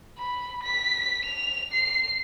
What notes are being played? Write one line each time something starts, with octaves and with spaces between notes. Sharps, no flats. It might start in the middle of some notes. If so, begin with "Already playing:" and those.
B5
B6
F7
C7